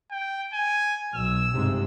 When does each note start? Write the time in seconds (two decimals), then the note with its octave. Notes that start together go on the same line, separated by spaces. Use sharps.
0.11 G5
0.53 G#5
1.15 B1 E6
1.54 G1 G#2 C3